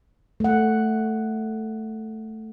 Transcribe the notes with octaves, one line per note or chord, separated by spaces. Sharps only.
A3 F#5